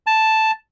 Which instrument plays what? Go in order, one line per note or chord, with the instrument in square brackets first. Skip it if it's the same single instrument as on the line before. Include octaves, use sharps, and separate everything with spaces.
[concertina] A5